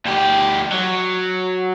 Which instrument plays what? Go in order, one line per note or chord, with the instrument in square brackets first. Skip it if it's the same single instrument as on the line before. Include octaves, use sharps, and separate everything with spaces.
[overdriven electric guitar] D2 G4
F#3